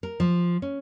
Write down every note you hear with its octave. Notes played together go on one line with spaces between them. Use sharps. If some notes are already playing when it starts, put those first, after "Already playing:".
A#4
F3
C#4